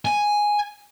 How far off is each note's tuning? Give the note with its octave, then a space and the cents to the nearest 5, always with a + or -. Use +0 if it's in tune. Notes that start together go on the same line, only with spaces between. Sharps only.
G#5 +0